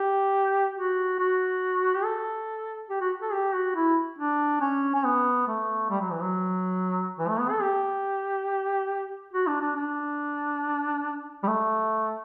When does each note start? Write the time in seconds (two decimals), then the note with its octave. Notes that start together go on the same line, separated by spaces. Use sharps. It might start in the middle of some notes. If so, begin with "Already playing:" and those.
Already playing: G4
0.76 F#4
1.19 F#4
1.95 G4
2.04 A4
2.90 G4
3.01 F#4
3.22 A4
3.32 G4
3.54 F#4
3.76 E4
4.19 D4
4.61 C#4
4.95 C#4
5.04 B3
5.47 A3
5.90 G3
6.01 F#3
6.11 E3
6.22 F#3
7.19 E3
7.29 A3
7.40 B3
7.50 A4
7.61 G4
9.33 F#4
9.47 D4
9.61 D4
9.76 D4
11.43 G3
11.47 A3